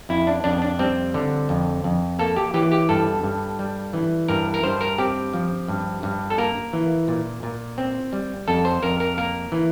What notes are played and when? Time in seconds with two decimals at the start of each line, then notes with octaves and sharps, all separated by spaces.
0.09 F2 E4
0.27 D4
0.44 F2 D4
0.62 D4
0.79 G3 C4
1.14 D3
1.49 F2
1.84 F2
2.19 A#3 A4
2.36 G4
2.54 E3 G4
2.71 G4
2.89 G2 A4
3.23 G2
3.59 G3
3.93 E3
4.28 G2 A#4
4.54 A#4
4.63 G2 C5
4.81 A#4
4.98 C4 G4
5.33 F3
5.68 G2
6.03 G2
6.30 A4
6.38 A#3 A#4
6.73 E3
7.08 A#2
7.43 A#2
7.78 C4
8.13 G3
8.48 F2 A4
8.65 C5
8.83 F2 A#4
9.00 A#4
9.18 A#3 A#4
9.52 E3